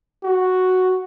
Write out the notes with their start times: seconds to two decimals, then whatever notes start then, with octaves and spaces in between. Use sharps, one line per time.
0.23 F#4